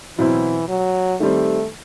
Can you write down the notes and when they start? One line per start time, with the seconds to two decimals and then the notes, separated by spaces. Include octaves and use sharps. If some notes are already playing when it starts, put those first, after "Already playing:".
0.18 B2 E3 F#3 C4 E4
0.69 F#3
1.20 D#3 G3 A3 C4